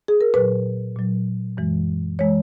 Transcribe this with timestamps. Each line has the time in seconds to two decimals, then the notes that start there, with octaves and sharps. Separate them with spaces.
0.08 G#4
0.21 A#4
0.34 A#2 F#3 B4
0.96 A#2 F#3
1.57 F#2 E3 G#3
2.19 E3 G#3 C#5